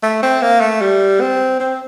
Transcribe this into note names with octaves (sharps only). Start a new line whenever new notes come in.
A3
C4
A#3
A3
G3
C4
C4